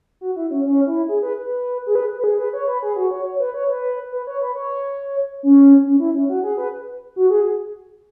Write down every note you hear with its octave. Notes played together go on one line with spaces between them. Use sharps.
F#4
E4
C#4
C#4
E4
G#4
B4
B4
G#4
B4
B4
G#4
B4
C#5
B4
G#4
F#4
C#5
C#5
B4
C#5
B4
B4
C#5
B4
C#5
C#4
C#4
E4
C#4
F#4
G#4
B4
F#4
G#4